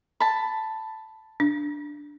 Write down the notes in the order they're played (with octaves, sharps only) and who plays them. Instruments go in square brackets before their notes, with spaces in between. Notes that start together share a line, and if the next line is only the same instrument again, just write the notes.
[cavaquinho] A5 B5
[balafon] D4